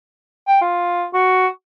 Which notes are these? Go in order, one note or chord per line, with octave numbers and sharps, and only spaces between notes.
G5
F4
F#4